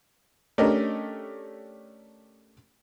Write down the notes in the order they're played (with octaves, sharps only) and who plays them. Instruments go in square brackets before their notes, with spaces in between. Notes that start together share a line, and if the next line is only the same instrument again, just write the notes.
[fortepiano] A3 C#4 D4 G4 A#4 D#5